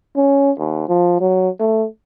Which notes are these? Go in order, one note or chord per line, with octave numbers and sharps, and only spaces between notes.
C#4
D#2
F3
F#3
A3